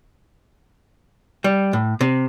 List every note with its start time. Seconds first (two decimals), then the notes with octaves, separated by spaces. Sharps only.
1.44 G3
1.73 A2
2.01 C3